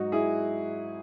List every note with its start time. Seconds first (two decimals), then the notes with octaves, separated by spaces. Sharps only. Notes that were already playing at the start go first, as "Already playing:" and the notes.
Already playing: G#2 F#3 D#4 F#4
0.12 E4 G#4